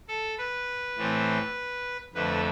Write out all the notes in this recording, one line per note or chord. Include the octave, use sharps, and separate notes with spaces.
A4
B4
A2 E3 A3 C4
F2 D3 A3 B4